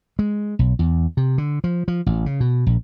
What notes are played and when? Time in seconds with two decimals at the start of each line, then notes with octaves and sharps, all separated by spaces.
0.19 G#3
0.59 B1
0.79 E2
1.17 C3
1.38 D3
1.64 F3
1.88 F3
2.06 A1
2.26 C#3
2.40 B2
2.67 A#1